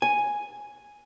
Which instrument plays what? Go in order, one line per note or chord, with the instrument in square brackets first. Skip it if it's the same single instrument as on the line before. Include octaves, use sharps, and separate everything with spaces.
[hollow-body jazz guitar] G#5